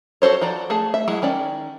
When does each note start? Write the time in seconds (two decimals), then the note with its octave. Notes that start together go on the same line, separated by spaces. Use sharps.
0.22 F#4 A4 C5 C#5
0.41 F3 F#4 D5 A#5
0.70 A3 G#4 A5
0.94 E5
1.08 F#3 G#3 E4
1.22 D#3 C#4 D5